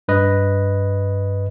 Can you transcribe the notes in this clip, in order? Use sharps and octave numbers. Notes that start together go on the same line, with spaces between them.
G2 B4 D#5